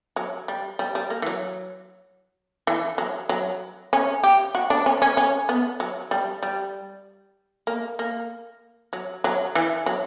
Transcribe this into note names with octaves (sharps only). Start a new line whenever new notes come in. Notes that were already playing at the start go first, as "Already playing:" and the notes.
F#3
G3
G3
G3
A#3
E3
F#3
E3
F#3
F#3
C#4
G4
F#4
D4
C#4
C#4
C#4
B3
F#3
G3
G3
A#3
A#3
F#3
F#3
E3
F#3